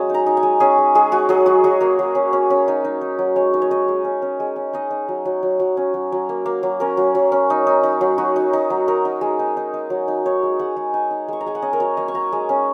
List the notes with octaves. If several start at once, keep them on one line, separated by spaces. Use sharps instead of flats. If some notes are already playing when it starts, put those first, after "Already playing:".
Already playing: F#3 G#3 C#4 G#5
D#4 A#5
D#4
G#5
G#3
C#4 G#4
G#3
G#3 G#4
G#3 F#4
F#3 G#4
F#3 F#4
F#3 G#4
A#3 A#4
F#3
C#4
C#4
C#4
D#4
D#4
D#4
F#3
G#3 C#5
D#4
C#5
D#4 D#5
G#3
C#4
C#4
G#3
C#4
D#4 D#5
D#4
F#3
F#3
F#3
F#3
C#4
F#3
F#3
A#3
A#3
F#3
C#4 A#4
F#3
F#3
C#4
D#4
D#4
D#4
F#3
D#4 F#4
D#4
D#4
F#3
D#4 A#4
D#4
G#3
D#4
D#4
D#4
F#3
D#4
D#4 C#5
G#3
G#3 F#5
G#3
D#4 G#5
D#4
G#3 C#6
A#5
G#3 G#5
F#5
C#4 D#5
A#4
F#3 C#5
A#3 D#5
C#6
A#3 A#5
G#3
C#4